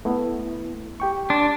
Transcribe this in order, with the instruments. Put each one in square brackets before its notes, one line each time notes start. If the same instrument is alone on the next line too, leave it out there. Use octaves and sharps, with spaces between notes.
[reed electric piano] A3 B3 E4
G4 G5 C#6
[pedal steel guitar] D4 [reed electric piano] C6